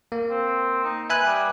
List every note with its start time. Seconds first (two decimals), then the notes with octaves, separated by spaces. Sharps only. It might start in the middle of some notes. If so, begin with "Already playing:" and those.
0.12 A#3
0.30 C4
0.84 D#4
1.10 B4 E5 G#5 F#6
1.26 G3